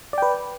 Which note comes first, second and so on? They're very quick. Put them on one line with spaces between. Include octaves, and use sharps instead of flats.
D5 G5 B4